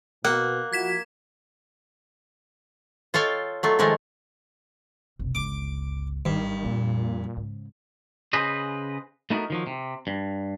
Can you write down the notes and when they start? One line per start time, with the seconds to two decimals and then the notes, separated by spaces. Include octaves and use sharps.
0.25 B2 A#3 F#5
0.73 F3 E4 F#4 G#6 B6 E7
3.14 F4 A4 C#5 F5 G5
3.63 F#3 A3 F4
3.79 D#3 F3 G#3 A3 A#4
5.19 F1 B1
5.35 G1 C#2 D6
6.25 G#1 G2 D#3 F#3
6.65 F2 A#2
7.37 G#2 C#3
8.33 C#3 G#4 B4 C5 D#5
9.30 A3 B3 D#4 F#4 A#4
9.50 D#3 F3 F#3
9.67 C3
10.07 G2